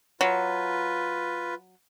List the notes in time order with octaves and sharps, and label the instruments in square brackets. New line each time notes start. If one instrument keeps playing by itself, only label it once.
[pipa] F#3 [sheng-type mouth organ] F4 B4